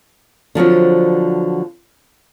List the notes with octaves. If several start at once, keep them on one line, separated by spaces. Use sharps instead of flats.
D3 F3 F#3 C4